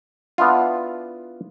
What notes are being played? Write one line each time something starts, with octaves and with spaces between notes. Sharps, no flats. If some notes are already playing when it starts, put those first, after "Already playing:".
B3 D4 E4 F4